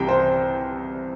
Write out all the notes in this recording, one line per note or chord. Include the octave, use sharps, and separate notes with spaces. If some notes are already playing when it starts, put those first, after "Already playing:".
Already playing: C2 C3 E3 G5
C5